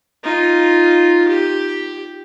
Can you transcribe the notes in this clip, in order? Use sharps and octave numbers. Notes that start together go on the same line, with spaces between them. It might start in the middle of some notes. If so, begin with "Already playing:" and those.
D#4 F4
G4